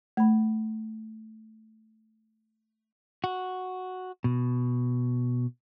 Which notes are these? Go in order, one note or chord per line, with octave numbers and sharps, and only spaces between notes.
A3 B5
F#4
B2